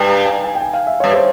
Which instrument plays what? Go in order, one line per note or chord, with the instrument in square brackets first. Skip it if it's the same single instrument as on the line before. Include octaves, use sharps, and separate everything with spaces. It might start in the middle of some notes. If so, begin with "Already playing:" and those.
Already playing: [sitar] G2 [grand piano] G5 G#5
[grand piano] A#5
G#5
G#5
G5
G#5
F5
E5
[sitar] G2 [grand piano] C#5
[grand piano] C5